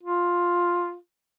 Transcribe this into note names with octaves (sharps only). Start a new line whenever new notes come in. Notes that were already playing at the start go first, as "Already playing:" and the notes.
F4